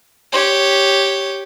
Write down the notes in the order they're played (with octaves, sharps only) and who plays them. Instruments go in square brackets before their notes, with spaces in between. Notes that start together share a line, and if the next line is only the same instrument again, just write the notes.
[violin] G4 C#5